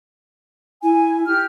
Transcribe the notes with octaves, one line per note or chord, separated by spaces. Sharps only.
E4 G#5
G4 F6